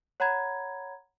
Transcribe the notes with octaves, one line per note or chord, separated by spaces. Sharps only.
C#5 F#5 A#5 B5 G#6